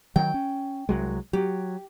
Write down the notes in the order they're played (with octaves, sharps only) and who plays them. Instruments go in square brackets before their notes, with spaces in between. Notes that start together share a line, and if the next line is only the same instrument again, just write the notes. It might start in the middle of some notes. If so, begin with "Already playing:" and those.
[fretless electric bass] D#3 F#3 [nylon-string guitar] G5
[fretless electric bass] C#4
C2 F#3 G#3
[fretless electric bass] F#3 [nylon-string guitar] G4